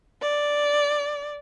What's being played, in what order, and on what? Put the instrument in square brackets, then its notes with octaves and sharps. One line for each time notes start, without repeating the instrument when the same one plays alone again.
[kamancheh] D5